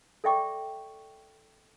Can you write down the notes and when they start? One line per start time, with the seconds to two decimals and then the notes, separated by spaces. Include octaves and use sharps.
0.24 A4 D5 E5 G5 C#6 D6